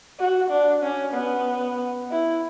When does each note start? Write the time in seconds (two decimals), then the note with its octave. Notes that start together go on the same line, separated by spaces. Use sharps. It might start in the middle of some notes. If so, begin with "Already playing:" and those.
0.19 F#4
0.50 D4
0.82 C#4
1.15 B3
2.11 E4